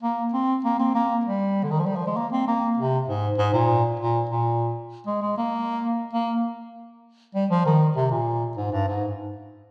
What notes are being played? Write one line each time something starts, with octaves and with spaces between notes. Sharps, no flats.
A#3
C4
A#3
C4
A#3
G3
D3
D#3
F3
G3
F3
G#3
A#3
C4
A#3
C3
G#2
G#2
A#2
A#2
A#2
G#3
G#3
A#3
A#3
G3
F3
D#3
C3
A#2
G#2
G2
G#2